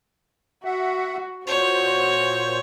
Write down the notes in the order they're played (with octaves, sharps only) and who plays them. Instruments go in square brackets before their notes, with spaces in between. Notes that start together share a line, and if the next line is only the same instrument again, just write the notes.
[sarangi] F#4 [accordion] E5 F#5
[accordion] A#2 C5 [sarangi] F#4 [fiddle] C#5